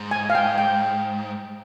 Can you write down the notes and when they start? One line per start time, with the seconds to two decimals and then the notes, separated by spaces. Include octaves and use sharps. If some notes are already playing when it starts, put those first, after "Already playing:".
Already playing: G#2
0.11 G#5
0.30 F5
0.35 G5
0.58 G5